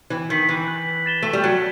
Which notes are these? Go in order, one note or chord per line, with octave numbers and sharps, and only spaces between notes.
E3
D#3 G6 B6 F#7
E3
F#6
A6 E7 G7
A3
G3
F#3 F#6